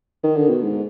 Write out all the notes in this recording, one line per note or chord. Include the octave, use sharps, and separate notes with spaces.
D#3
D3
B2
G#2